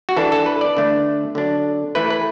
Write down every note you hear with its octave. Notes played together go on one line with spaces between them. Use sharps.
F#4
E3 D4 A4
A4
B4
D5
D3 A3 D4
D3 F#3 D4
E3 A3 E4 B4
B4